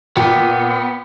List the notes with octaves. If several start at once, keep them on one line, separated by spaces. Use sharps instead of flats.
A#2 B3 G5